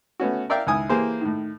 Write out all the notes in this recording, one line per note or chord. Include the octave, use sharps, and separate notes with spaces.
A3 B3 C#4 F#4
A#4 D5 E5 F5 G5
C#2 D#3 E4 G#5 D#6
E3 A#3 G4 G#4 C5
A2 D#3